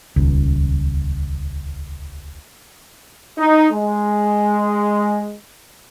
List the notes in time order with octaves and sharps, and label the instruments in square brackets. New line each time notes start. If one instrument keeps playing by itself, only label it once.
[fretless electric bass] D#1 C#2
[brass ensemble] D#4
G#3